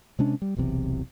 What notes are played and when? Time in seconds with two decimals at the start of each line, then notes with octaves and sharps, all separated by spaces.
0.19 C3 G#3 C#4 D4
0.42 G3
0.56 E1 B1 E2 C3